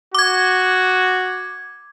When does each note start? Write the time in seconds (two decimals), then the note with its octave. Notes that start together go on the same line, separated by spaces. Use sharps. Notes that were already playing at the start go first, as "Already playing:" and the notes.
0.15 F#4 D6 G#6